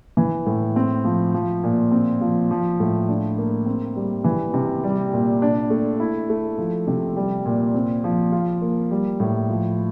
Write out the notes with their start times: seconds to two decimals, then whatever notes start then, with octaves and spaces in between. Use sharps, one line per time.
0.17 E3
0.47 A2
0.76 C4
1.05 F3
1.34 F3
1.64 A#2
1.92 C4
2.21 F3
2.51 F3
2.80 A2
3.08 D4
3.38 A#3
3.66 C4
3.96 G3
4.24 E3
4.54 C3
4.84 G3
5.13 A#2
5.42 D4
5.70 A3
6.00 E4
6.29 A3
6.58 F3
6.87 C3
7.16 G3
7.46 A#2
7.74 C4
8.04 F3
8.32 F4
8.62 A#3
8.91 G3
9.20 A2
9.49 F3